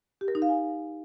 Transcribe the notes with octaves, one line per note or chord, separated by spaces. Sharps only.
G4
A#4
D#4
F5
G#5